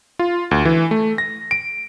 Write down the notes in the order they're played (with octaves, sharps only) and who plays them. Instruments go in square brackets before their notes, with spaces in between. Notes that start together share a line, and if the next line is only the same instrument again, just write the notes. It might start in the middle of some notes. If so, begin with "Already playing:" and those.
[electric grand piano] F4
D2
E3
A3
A#6
D7